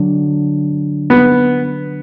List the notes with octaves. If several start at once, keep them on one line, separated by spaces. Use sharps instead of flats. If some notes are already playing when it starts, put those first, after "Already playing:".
Already playing: D3 F#3 D4
B3